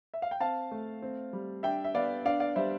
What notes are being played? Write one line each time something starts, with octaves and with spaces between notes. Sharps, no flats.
E5
F5
G5
C4 F5 A5
A3
C4
G3
D4 E5 G5
E5
B3 D5 F5
D4 D5 F5
D5 F5
G3 C5 E5